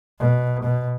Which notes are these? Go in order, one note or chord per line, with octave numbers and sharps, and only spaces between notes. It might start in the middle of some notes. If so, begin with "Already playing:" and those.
B2
B2